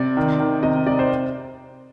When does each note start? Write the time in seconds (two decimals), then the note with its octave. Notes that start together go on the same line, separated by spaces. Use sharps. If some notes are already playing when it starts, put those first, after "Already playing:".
Already playing: C3 D5
0.17 D#3
0.40 D#3
0.63 C3 D#5
0.86 C3 D5
0.99 C5